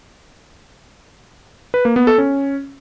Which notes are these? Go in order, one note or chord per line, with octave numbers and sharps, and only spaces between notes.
B4
A#3
B3
A4
C#4